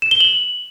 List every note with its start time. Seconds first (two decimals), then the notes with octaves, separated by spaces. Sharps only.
0.02 E7
0.11 G7
0.20 F#7